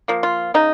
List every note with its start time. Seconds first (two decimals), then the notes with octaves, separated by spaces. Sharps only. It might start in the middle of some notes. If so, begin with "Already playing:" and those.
0.08 F3 A#3
0.23 F4
0.54 C#3 D#4